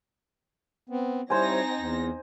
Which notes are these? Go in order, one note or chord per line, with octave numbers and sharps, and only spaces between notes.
B3 C4
G3 C4 D#4 E4 C5 C#5 G#5 A#6
E2